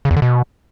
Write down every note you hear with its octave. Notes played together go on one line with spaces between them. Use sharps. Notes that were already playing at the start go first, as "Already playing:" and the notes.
C#3
E2
D3
B2